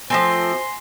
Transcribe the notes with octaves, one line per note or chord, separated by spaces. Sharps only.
F3 A3 C4 C5 G#5 C6 A#6